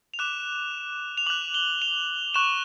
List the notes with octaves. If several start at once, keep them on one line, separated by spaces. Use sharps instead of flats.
F7
D6 F#6 E7
F7
D6 F#6 F#7
G7
F7
C#6 F#6 E7